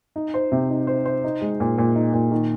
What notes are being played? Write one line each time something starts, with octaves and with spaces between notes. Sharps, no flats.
D#4
C5
C3
D#4
C5
C5
D#4
G#3
A#2
A#2
D#4
A#2
D#3